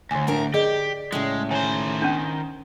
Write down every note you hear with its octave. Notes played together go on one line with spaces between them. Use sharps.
D2 D3 G#5
A2 D4 A#4
G4 G#4 D5 D#5
A2 C#3 G#3
D#3 C5 C#5 G#5
C#4 D4